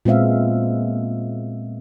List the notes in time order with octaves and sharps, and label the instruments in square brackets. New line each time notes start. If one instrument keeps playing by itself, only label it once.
[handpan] A#2 G#3 B3 C4 E5 F5